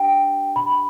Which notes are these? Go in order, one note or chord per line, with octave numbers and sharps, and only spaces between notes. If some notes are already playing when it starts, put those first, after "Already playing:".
Already playing: D4 G4 G5
B5